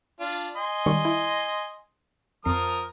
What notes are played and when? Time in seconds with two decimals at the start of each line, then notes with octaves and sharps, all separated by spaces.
0.20 D4 F4
0.56 D#5 G#5 C6
0.86 D#3 G3 C#6
1.05 E4
2.45 F2 F3 A#4 D#6 C7